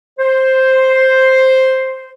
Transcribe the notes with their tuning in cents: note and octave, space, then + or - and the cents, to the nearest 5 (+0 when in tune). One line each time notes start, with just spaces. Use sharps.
C5 +5